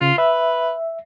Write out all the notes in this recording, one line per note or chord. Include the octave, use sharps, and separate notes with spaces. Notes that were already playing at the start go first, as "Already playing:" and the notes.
C#3 F4
B4 E5